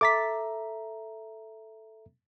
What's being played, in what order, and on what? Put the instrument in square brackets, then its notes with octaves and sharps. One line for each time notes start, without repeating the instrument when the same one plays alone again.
[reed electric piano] A4 E5 A#5 [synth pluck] D6 A6 B6